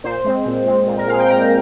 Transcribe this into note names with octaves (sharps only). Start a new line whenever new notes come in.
A#2 C5
G#3 C4
A#2
G#3 C4
A#2
A#4
G#3 C4 F5
G5
A#2 A#5